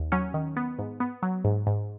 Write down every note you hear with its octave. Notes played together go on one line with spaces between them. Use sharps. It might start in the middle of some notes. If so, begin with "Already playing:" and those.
Already playing: D#2
F#3 C#4
D#3
B3
G#2
B3
F#3
G#2
G#2